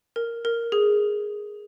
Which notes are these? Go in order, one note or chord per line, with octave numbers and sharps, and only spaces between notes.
A#4
A#4
G#4